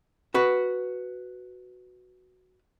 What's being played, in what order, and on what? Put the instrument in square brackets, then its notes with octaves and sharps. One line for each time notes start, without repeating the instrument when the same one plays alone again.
[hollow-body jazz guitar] F#4 B4